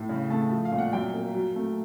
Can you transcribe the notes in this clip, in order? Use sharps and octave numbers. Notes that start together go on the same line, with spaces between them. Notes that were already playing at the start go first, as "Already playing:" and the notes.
Already playing: A2
C#3
A3 A5
F3
F5
A#2
F#5
F#2 G5
A#3
F#3
A3